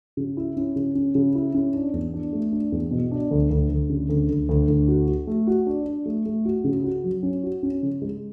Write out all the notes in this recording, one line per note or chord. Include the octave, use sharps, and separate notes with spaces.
C#3
E4
C#4
C#3
C#4
C#3
E4
C#4
D4
E2
D4
A3
D4
E2
B2
D4
D2
D2
D2
C#3
D2
D2
D2
D2
F#4
F#4
A3
F#4
D4
D4
A3
A3
F#4
C#3
F#4
F#3
C#4
F#4
C#4
C#3
G#3